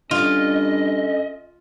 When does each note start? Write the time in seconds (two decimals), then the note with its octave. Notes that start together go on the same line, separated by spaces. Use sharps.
0.11 G2 C#4 F4 A4 D#5